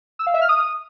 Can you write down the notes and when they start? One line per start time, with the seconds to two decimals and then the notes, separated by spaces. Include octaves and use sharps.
0.19 E6
0.27 F5
0.34 E5
0.41 F6
0.49 D#6